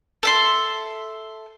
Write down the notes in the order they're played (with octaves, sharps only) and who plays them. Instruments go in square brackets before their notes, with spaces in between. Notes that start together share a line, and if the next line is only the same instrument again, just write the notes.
[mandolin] A4 E5 C6